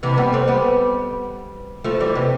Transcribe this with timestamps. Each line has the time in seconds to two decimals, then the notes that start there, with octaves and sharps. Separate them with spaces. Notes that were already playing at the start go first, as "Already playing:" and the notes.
0.03 C3 E3
0.17 G3 B3
0.33 A3 C4
0.48 G3 B3
1.84 F3 A3
2.00 E3 G3
2.15 C3